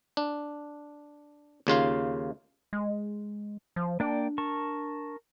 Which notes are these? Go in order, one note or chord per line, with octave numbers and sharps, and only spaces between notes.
D4
D#2 C#3 F4 F5
G#3
F3
A#3 D4 D5 G5
A#4 A5 C#6